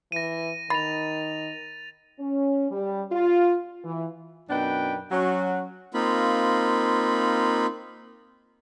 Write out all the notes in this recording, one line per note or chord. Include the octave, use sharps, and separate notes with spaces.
E3 A#6 D#7
D#3 B5 A6 F7
C#4
G3
F4
E3
F#2 B2 D4 D#4 B4 G5
F#3 C#4 F#4
A#3 C4 D#4 F4 B5